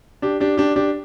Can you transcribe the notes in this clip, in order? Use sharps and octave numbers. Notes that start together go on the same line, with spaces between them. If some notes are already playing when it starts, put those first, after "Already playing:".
D4 G4
D4 G4
D4 G4
D4 G4